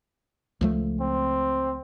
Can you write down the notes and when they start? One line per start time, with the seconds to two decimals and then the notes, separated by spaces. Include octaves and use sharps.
0.61 C#2 F3 A3
1.00 C4